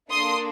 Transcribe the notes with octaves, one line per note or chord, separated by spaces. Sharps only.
A#3 D4 A4 C6 D#6